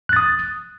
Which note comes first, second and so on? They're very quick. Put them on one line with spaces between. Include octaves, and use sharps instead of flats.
F#6 A6 D#6